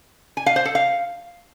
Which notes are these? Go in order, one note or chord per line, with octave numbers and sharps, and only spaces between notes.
G#5
F5
C5
A4
F5